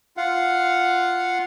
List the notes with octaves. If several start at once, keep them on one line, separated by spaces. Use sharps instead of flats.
F4 F5 F#5